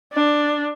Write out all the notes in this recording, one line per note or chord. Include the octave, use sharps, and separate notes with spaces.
D4